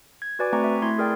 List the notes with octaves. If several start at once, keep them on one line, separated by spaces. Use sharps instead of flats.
G#6
F#4 B4 D5 G#5 D6
A3 C4 G#5 A#5 C#6 D6
E5
A3 E4 C6 G#6
G#4 A#4 D5 G5